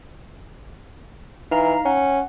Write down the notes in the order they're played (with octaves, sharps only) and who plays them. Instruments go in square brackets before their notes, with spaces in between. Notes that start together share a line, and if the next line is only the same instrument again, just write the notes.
[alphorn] E3 [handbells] D#4 F5 A#5
[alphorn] C#4 [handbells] F#5